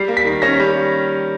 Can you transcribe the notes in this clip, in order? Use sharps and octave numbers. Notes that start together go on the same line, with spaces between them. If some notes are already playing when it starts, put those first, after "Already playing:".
Already playing: G3 C7
A#3
B6
D#3
C#4 A#6
G3